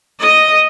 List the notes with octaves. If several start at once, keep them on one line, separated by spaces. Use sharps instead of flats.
D#5